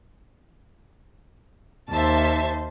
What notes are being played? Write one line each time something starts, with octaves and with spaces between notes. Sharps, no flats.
D#2 C5 E5 A5